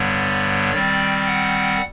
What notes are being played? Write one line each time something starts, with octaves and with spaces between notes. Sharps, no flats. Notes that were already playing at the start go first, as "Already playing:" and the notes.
Already playing: G2 D3 G3 B3 C#5
D#3 G3 C4 D5
F#5